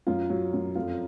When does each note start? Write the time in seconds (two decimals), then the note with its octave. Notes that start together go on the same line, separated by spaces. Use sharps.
0.07 F#2 F4
0.30 F#3
0.53 F#2
0.75 F2 F4